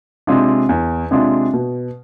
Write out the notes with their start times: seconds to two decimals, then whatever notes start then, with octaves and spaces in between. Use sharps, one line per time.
0.27 C3 G#3 D4 F4
0.69 E2
1.11 C3 G#3 D4 F4
1.53 B2